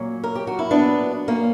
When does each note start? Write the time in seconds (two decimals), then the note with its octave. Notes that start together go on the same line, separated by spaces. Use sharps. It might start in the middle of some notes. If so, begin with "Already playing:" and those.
Already playing: A#2 F#3 A#3 C#4
0.24 A#4
0.35 G4
0.47 F#4
0.59 E4
0.71 B3 D4
1.28 A#3 C#4